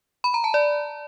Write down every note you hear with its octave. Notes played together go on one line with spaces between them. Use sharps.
B5
A#5
A5
D5